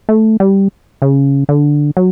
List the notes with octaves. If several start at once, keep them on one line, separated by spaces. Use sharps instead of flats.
A3
G3
C#3
D3
F#3